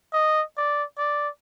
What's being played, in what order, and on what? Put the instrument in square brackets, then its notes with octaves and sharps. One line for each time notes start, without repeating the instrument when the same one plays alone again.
[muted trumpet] D#5
D5
D5